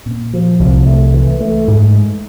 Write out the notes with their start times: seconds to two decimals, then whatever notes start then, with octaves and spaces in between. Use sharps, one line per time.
0.06 A#2
0.33 F3
0.59 C2
0.86 A3
1.14 E3
1.40 A3
1.68 G#2